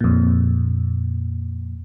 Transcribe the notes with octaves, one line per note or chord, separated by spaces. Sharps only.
F2 A#2